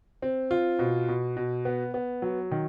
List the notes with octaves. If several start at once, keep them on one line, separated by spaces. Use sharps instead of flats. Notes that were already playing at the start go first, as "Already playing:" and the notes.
C4
F4
B2
B2
B2
B3
B3
F#3
D#3